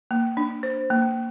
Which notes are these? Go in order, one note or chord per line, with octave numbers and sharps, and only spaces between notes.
A#3
D4
C5
A#3